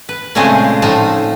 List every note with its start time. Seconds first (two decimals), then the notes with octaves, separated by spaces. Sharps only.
0.09 B4
0.35 A#2 C#3 G#3 A3 C4 G#4
0.82 A2 F3 A3 D#4